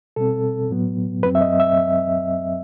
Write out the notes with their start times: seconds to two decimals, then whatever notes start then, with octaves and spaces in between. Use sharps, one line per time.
0.16 B2 G3 C4 A4
0.70 A2 F#3 B3
1.23 F#2 F#3 C4 B4
1.35 E5
1.41 D#5
1.60 E5